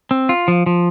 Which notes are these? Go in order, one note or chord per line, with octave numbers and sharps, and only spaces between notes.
C4
F4
F3
F3